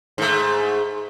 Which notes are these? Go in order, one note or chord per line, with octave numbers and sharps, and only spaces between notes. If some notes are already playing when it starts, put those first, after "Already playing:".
G#2 A3